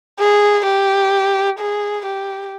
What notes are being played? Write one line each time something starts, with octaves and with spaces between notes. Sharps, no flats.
G#4
G4
G#4
G4